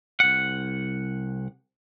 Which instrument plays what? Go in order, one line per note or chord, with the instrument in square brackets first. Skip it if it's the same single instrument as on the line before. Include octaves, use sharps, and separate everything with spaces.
[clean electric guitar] C2 F#5